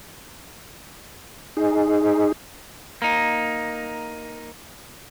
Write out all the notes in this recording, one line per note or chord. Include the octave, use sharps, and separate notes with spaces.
D#4 G#4
A#3 D#4